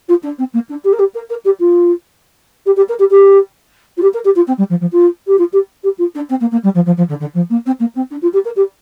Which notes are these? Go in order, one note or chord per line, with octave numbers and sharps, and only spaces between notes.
F4
D4
C4
A#3
D4
G4
A#4
G4
A#4
A#4
G4
F4
G4
G4
A#4
G4
G4
F4
G4
A#4
G4
F4
C4
G3
F3
F3
F4
G4
F4
G4
G4
F4
D4
C4
A#3
A#3
G3
F3
F3
F3
D3
D3
F3
A#3
C4
A#3
C4
D4
F4
G4
A#4
G4